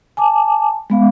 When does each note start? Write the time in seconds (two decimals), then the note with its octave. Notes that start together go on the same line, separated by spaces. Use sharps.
0.17 G#5 A5 D6
0.90 G#3 B3 F5